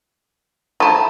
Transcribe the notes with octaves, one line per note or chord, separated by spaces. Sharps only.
F3 A3 E4 A5 A#5